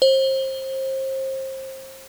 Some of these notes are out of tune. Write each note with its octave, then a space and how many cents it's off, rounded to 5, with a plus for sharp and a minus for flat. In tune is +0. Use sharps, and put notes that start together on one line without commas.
C5 +30